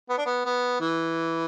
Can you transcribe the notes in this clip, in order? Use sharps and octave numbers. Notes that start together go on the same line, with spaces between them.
B3
D4
B3
B3
E3